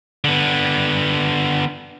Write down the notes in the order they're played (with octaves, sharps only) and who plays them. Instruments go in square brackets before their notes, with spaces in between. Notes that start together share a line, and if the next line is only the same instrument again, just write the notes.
[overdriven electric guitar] D3 B3